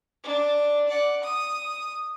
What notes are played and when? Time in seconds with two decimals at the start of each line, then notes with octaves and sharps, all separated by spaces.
0.23 D4
0.89 D5 F#5
1.23 D#6